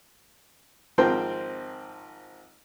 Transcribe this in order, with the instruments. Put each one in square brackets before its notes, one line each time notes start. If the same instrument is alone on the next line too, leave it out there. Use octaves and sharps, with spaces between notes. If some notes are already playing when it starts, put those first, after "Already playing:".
[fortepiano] G#1 F3 C4 A#4 G5 C6